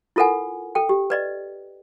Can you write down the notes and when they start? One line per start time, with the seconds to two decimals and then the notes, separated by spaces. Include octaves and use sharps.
0.16 E4 F4 A4 A#4 F#5 G#5
0.75 A4 G5
0.89 G4
1.10 B4 D5 D#5